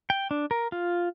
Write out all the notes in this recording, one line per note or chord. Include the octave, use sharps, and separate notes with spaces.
G5
D4
A#4
F4